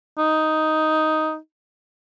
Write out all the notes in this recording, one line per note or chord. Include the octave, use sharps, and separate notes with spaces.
D#4